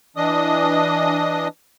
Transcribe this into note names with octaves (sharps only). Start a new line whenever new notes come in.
E3 D4 D#5 D#6